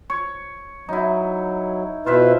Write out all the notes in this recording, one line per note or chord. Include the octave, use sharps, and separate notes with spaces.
C#5
F#3 D#4 E4
B2 E4 F4 B4 C5 E5